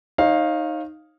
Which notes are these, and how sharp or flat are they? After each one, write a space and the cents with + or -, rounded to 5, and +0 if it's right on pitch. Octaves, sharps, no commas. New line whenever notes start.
D#4 +0 C#5 -35 F5 +0